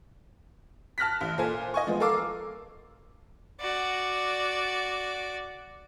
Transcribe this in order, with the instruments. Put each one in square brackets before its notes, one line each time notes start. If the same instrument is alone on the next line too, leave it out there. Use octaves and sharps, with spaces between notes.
[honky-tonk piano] A5 F6 F#6 A#6 B6
A1
A#2 A4 C5 G#5
D#5 G#5 C#6
F3 G#3 B3
A4 A#4 F5 D6 E6
[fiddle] F#4 D5